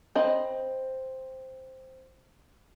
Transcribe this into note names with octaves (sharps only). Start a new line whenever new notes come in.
C4 D#5 B5